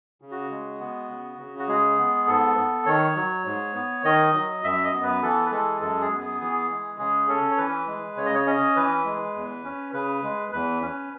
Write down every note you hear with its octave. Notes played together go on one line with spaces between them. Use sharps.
C#3
F#4
G#3
B3
C#3
C#3
F#4
G#3 G#4
B3
G#2 A4
B3
D#3 C#5
F#3
G#2
B3
D#3 D#5
F#3
F#2 E5
D#5
B3
B4
E3 A4
B4
G#3 A4
F#2 A4
G#4
B3
G#4
E3 G#4
G#3
C#3 G#4
C#4 A4
C#5
E3 B4
G#3
C#3 C#5
D#5
C#5
C#4 D#5
E3 B4
G#3
E2
C#4
C#3 B4
G#3
E2 B4
C#4